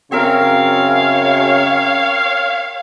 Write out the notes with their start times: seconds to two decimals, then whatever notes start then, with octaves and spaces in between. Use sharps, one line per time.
0.12 F#2 C#3 C4 A#4 C#5 F5